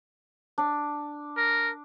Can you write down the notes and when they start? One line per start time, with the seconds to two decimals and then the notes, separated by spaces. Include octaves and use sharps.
0.58 D4
1.37 A#4